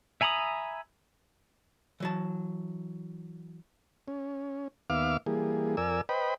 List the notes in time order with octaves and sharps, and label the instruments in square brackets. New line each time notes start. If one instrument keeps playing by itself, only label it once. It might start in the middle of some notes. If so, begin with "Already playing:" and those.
[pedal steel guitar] E5 G#5 A#5 B5 D#6
[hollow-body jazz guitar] E3 F#3 A5
[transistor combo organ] C#4
D#2 B3 E5 F5 D6 F6
E3 G3 A#3 G#4
F2 A#4 D5 G#5 E6
B4 C5 D#5 G5 B5